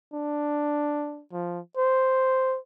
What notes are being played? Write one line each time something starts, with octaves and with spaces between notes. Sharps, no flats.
D4
F3
C5